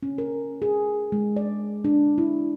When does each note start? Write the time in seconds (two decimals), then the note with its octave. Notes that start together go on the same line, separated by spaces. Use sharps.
0.03 C#4
0.18 A#4
0.62 G#4
1.12 G#3
1.36 D5
1.84 D4
2.18 E4